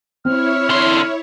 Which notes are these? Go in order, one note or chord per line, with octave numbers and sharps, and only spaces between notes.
C4 E4 C#5 F6
D3 C6